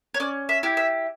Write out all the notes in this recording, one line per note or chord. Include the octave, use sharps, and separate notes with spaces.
C#5
C#4 D5
E5
E4 G4
E5